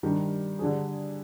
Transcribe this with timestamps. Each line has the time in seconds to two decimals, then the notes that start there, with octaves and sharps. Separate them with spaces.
0.03 D#3 G3 D4 G4
0.59 D3 G3 D4 G#4